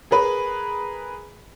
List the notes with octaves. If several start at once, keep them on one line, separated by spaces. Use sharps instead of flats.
G#4 A#4 B4 B5